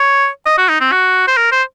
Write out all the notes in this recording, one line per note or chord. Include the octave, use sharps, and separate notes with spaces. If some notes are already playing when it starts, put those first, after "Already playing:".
Already playing: C#5
D#5
F#4
D#4
C4
F#4
C5
A#4
C5